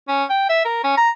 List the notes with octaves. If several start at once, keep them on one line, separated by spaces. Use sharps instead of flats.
C#4
G5
E5
A#4
C#4
A#5